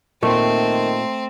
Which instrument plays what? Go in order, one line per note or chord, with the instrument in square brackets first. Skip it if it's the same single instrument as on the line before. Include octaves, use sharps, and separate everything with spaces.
[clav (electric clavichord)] A#2 [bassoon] D#3 [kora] A3 [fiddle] C4 C5